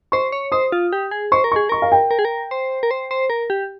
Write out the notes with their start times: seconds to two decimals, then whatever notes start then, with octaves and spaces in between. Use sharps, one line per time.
0.12 C5 C#6
0.32 C#5
0.52 C5 D#6
0.72 F4
0.93 G4
1.11 G#4
1.32 C5 C#6
1.44 A#4
1.52 G#4 C#6
1.69 A#4 C#6
1.82 F5
1.92 G5
2.11 A#4
2.19 G#4
2.25 A#4
2.51 C5
2.83 A#4
2.91 C5
3.11 C5
3.30 A#4
3.50 G4